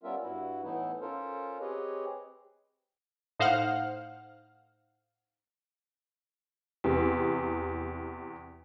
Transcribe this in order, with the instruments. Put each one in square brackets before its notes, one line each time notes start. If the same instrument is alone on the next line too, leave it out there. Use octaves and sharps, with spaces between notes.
[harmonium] G3 B3 C#4 F4 A#4 E5
G2 E4 F#4
A2 E3 A3 B3 D#4 E4
C#4 F4 A4 A#4 C5
C4 G4 G#4 B4 C#5 D#5
[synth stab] A2 D#4 C5 F5 F#5 F6
[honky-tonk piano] E2 C3